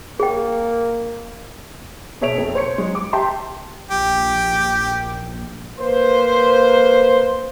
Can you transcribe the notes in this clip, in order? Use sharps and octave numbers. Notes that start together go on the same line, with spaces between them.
A#3 G#4 G5
B2 G#4 C#5 E5 D7 F7
F2
C5 C#5 C#7
F#3 G#3
D6
G4 E5 G5 A5 A#5 C6
A#1 G4
A#3 B4 C5